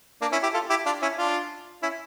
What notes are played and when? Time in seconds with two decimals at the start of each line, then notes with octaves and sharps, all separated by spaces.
0.22 A#3 D4
0.32 C#4 E4
0.43 E4 G4
0.54 F4 A4
0.70 E4 G4
0.86 D4 F4
1.02 C#4 E4
1.18 D4 F4
1.83 C#4 E4